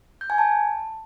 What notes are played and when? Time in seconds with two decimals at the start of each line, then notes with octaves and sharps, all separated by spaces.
0.21 G6
0.30 G#5
0.38 A5